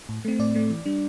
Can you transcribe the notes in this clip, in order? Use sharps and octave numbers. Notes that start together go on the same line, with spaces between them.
A2
A3 C4
A2 D5
A3 C4
E3
G3 D4